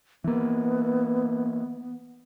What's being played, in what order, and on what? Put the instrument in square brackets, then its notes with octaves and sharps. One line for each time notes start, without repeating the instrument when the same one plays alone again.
[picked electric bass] E3 A#3 [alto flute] B3